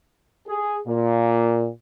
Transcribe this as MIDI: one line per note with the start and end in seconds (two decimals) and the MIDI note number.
0.48 0.77 68
0.87 1.68 46